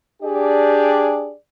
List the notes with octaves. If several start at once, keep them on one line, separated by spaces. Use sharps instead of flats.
D4 G4 G#4 D5